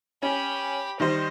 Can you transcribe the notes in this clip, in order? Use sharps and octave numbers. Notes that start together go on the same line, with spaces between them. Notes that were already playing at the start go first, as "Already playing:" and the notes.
C#4 G4 B5
D#3 G3 C5 D#5